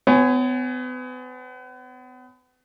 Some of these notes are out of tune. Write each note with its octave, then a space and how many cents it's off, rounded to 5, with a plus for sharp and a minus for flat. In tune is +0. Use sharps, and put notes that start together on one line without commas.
B3 +40 C#5 +0 G#5 +0